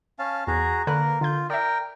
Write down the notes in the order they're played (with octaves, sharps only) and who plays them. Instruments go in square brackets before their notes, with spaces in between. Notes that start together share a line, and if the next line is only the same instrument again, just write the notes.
[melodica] C#4 F5 A5
[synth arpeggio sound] E2 [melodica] F#4 G#4 A#5
[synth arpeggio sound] D3 B4 F#6 [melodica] A#3 A#4
[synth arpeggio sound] D3 G6 [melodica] F4
[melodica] A#4 G5 [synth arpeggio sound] D5 E5